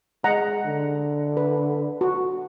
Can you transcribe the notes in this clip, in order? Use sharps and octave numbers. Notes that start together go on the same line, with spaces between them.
G#3 D#5 F#5 A#5
D3
B4
F#4